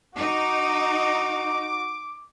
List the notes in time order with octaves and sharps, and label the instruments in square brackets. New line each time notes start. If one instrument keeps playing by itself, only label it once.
[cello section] D#4 [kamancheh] F#4 [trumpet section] D6